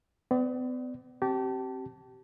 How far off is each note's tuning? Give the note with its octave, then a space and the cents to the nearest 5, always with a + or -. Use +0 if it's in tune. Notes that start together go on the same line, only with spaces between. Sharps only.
B3 +45 D5 +0
C4 +25 G4 -30 A5 +0